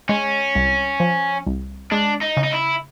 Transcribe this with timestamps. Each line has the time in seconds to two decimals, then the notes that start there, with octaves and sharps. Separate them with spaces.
0.09 G#3 C#4
0.55 C2
1.00 F3
1.47 C2
1.91 G#3 D4
2.21 D#4
2.37 C#3
2.43 D#4
2.53 E4